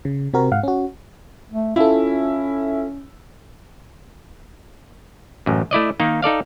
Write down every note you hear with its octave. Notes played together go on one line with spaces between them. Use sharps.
C#3
C3 C4 F#4 A#4
G#2 F5 F#5
C#4 F#4
A3
C#4 E4 F4 A4
A1 F#2
A3 E4 D5 D#5
D#3 A#3 D#4
D#4 A4 D5 F5